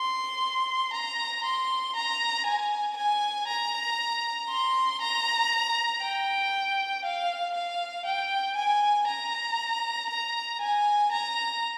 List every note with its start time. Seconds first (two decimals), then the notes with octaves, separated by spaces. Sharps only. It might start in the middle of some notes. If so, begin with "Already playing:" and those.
Already playing: C6
0.93 A#5
1.44 C6
1.95 A#5
2.46 G#5
2.96 G#5
3.48 A#5
4.49 C6
5.01 A#5
6.02 G5
7.04 F5
7.54 F5
8.05 G5
8.56 G#5
9.07 A#5
10.10 A#5
10.61 G#5
11.11 A#5